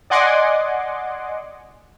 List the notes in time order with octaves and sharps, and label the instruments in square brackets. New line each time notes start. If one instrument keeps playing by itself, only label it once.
[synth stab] D5 D#5 F#5 G#5 C6 D6